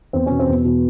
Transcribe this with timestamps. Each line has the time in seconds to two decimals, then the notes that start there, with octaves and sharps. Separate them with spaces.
0.13 E2 C4
0.26 B2 C#4
0.39 C4
0.48 E2
0.65 B2